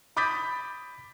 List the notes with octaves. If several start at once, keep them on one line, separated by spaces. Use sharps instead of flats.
B5 D6 D#6 G6 A6 B6